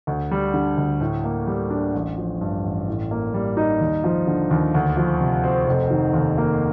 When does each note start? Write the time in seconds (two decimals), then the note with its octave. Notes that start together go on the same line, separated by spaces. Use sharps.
0.07 D2
0.31 G3
0.54 D3
0.77 D2
1.01 A2
1.24 A#3
1.47 G3
1.70 D4
1.94 A1
2.17 F3
2.41 G2
2.64 A1
2.88 A2
3.11 A#3
3.34 G3
3.57 D#4
3.81 D#2
4.04 F3
4.27 D3
4.51 D#2
4.74 D2
4.97 F3
5.21 C3
5.44 C4
5.67 F1
5.90 D#3
6.14 D#2
6.38 A#3